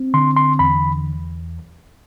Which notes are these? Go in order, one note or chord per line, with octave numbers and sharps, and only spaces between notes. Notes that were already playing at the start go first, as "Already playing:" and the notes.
Already playing: C4
D3 C6
C6
E2 B5